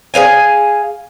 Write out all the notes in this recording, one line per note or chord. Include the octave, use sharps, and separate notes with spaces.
G#4 B4 F5 G#5